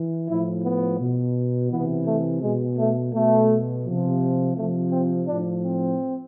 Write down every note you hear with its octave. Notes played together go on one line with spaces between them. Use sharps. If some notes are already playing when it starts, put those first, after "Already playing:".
Already playing: E3
A2 F3 E4
B3
B2
C3 E3 B3
A3
B2 G#3
A3
B2 A3
C3 F3
C3 F3 A3
C4
A2 F3 D4
C4